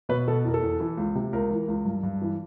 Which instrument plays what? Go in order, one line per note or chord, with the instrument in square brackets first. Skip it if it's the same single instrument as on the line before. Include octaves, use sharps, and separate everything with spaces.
[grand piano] B2 B4
B2 A4
E2 A#4
A4
E2
E3
C#2
C3
C#2 A#4
E3
C#2
G2
G2
E3